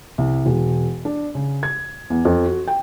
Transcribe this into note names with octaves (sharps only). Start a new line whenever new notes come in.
C2
E1
D4
C#3
G#6
E2
F2
F#4
G5